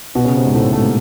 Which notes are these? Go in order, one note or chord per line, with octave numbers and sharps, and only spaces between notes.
B2 B3
C#3 C#4
C3 C4
G#2 G#3
A2 A3
A2 A3
A#3